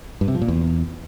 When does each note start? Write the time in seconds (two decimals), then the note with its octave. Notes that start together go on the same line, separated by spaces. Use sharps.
0.21 G2
0.28 C3
0.35 F3
0.42 A#2
0.48 E2